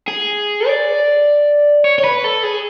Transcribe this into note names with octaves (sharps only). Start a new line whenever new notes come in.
G#4
D5
C#5
C#5
B4
A4
G#4